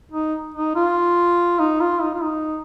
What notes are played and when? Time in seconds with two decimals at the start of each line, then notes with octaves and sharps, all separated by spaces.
0.12 D#4
0.54 D#4
0.75 F4
1.59 D#4
1.81 F4
2.02 D#4
2.14 F4
2.23 D#4